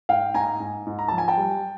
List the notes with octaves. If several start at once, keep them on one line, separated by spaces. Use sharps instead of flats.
G#2 F5 G5
G#2 G#5 A#5
G#2
G#2
A#5
F3 A5
G#5
G5 A5
G3